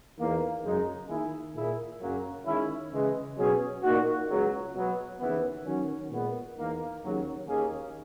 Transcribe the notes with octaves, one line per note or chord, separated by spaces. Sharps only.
E2 D#3 A#3
F#2 C#3 G#3 D#4
D#3 A#3 E4 G#4
A#2 A#3 E4 G#4
F#2 C#3 F#3 A#3 C#4
D#3 G#3 C#4 E4
C#3 E3 G#3
B2 F#3 C#4 G#4
A#2 A#3 D#4 F#4
C#2 C#3 F#3
B2 F#3 B3
D#2 C#3 E3 B3
D#3 F#3 C#4
A#2 G#3 B3
E2 D#3 A#3
D#2 C#3 F#3 C#4
D#2 D#3 A#3 C#4 G#4